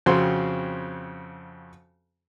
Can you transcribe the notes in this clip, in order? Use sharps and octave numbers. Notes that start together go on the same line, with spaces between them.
F2 C#3 C4 F#4 C6